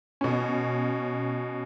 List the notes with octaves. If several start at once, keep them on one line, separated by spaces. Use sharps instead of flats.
B2 C#4